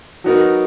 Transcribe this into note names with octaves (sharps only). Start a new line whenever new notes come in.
F#3 B3 D#4 F#4 A#4